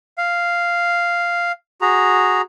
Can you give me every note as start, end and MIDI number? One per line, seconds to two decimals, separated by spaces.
0.18 1.52 77
1.81 2.41 66
1.81 2.41 68
1.81 2.41 82